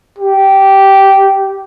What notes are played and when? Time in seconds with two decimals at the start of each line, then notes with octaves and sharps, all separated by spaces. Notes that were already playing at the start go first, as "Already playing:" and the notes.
0.19 G4